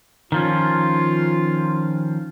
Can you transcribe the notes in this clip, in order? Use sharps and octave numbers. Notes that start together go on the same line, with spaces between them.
D#3 F3 C#4 F4